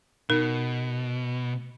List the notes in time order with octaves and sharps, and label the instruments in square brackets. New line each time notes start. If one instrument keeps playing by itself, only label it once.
[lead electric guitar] B2 [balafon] D#4 A#4